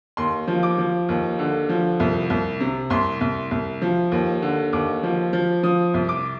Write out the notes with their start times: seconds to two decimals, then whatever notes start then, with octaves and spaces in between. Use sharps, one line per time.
0.17 D#2 C6
0.47 F3
0.63 D6
0.78 F3
1.09 D#2
1.39 D3
1.69 F3
2.00 C2
2.30 C2
2.60 C3
2.90 C2 C6
3.21 C2
3.51 C2
3.82 F3
4.12 D#2
4.42 D3
4.73 D#2 D6
5.03 F3
5.33 F3
5.63 F3 D#6
5.94 C2
6.09 D6